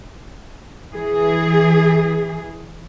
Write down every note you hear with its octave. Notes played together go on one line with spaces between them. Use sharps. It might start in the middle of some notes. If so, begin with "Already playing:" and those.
E3 G#4